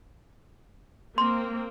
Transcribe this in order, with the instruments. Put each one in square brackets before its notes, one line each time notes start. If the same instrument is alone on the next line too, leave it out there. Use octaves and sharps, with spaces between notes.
[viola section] A#3 C4 [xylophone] C6